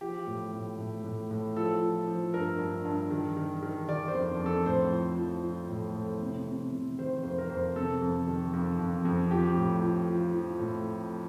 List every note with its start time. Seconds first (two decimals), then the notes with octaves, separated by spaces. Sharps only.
0.01 F3 G4
0.27 A2
0.53 A2
0.78 A2
1.04 A2
1.31 A2
1.56 F3 A4
1.81 F3
2.08 F3
2.34 G2 A#4
2.59 G2
2.85 G2
3.11 D#3
3.37 D#3
3.62 D#3
3.89 D#3 D5
4.08 C5
4.14 F2
4.40 F2
4.46 A4
4.66 A2 C5
4.92 F3
5.18 F3
5.44 F3
5.69 A2
5.96 A2
6.22 C3
6.47 C3
6.73 C3
6.99 D#3 C5
7.24 F2 C5
7.38 A#4
7.50 F2 C5
7.76 C3 A4
8.02 F2
8.28 D#3
8.53 F2
8.79 F2
9.05 F2
9.31 F3 G4
9.57 A2
9.83 F3
10.08 F3
10.34 F3
10.60 A2